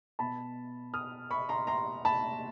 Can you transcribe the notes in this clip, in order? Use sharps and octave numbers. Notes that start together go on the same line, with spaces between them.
B2 A5 B5
D#6 F6
B5 C#6
A#5 C6
A#5 C6
A5 B5